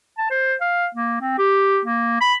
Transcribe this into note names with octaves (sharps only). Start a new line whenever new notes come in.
A5
C5
F5
A#3
C4
G4
A#3
B5